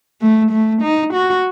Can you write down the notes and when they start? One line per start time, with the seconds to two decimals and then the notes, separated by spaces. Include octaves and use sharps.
0.21 A3
0.51 A3
0.82 D#4
1.14 F#4